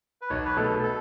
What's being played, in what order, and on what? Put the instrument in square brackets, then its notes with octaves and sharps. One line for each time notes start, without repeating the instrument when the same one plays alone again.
[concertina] B4
[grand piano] B1 [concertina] C#5
[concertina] B4
[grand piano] B2 A3 [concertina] A4
[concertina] A4